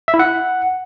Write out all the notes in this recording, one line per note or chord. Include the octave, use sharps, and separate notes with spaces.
E5
E4
F#5